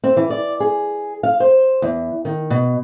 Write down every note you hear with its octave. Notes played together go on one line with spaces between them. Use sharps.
C4
E3
D5
G#4
F5
C5
E2
D#3
B2